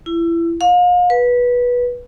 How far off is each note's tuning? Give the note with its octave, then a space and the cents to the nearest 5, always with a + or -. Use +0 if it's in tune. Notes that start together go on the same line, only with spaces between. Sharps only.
E4 +25
F5 +40
B4 -15